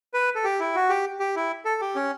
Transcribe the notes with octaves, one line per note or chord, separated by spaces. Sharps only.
B4
A4
G4
E4
F#4
G4
G4
E4
A4
G4
C#4